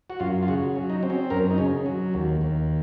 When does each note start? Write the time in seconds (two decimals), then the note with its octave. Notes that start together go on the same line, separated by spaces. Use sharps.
0.10 F#4
0.20 F#2 F4
0.43 F4
0.48 C#3 F#4
0.75 F#3
0.90 D#4
1.03 C4
1.10 C#4
1.30 F#2 A#4
1.51 D#4
1.58 C#3 C#4
1.86 F#3
2.14 D#2
2.41 D#2